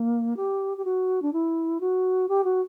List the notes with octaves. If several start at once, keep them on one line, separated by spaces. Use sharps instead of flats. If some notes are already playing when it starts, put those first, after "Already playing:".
Already playing: A#3
G4
G4
F#4
D4
E4
F#4
G4
F#4